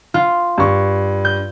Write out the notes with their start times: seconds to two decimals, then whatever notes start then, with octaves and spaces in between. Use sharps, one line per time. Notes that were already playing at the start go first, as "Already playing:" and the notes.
0.14 F4
0.58 G2 C#6
1.25 G6